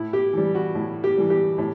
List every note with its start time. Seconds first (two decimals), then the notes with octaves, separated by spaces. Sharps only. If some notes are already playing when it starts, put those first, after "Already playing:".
Already playing: A2 E4
0.13 G4
0.33 E3 G3
0.55 F#4
0.75 A2
1.04 G4
1.18 E3 G3
1.30 G4
1.58 A2